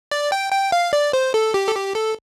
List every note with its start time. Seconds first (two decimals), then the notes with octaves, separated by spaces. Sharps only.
0.11 D5
0.32 G5
0.52 G5
0.72 F5
0.93 D5
1.13 C5
1.34 A4
1.54 G4
1.68 A4
1.75 G4
1.95 A4